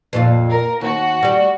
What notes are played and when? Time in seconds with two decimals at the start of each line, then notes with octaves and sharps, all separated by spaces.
0.13 F2 A#2 F4
0.50 A#4
0.81 D#2 F#4
1.23 G3 G4